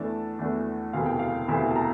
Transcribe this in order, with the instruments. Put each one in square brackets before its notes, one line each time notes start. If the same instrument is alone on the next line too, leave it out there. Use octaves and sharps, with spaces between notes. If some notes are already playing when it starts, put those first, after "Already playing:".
Already playing: [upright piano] E2 E3 A3 D4 A5
E2 E3 A3 D4
E1 D2 C3 E3 F5
G5
F5
E1 D2 C3 E3 E5
A5
A#5